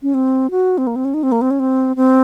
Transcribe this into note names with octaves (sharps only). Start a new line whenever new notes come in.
C#4
C4
F#4
C4
A#3
C4
C#4
D#4
C4
A#3
C4
C#4
C4
C4